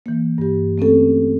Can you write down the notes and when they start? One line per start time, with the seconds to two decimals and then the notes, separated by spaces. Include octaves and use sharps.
0.06 E3 A#3
0.38 G2 G4
0.78 A3 C4 C#4 A4